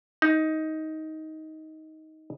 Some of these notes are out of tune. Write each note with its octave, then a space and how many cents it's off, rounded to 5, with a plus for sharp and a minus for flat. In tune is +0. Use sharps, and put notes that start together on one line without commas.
D#4 +15